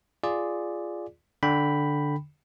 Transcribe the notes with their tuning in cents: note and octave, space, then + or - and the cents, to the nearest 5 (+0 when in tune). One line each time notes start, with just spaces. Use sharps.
F4 -10 G#4 +0 D5 +0
D3 +0 G5 +0 B5 +0